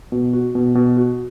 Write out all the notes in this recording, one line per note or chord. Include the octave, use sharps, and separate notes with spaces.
B2
F#4
B2
B2
F#4